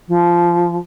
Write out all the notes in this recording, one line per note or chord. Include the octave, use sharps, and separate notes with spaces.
F3